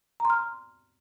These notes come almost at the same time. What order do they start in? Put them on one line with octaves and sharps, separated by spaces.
A#5 C6 F6